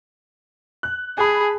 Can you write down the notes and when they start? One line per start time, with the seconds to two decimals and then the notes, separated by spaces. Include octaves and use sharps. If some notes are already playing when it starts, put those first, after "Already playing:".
0.83 F#6
1.18 G#4 G#5 A5 B5